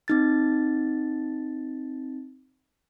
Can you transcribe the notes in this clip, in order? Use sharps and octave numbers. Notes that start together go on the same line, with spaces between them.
C4 D#4 A6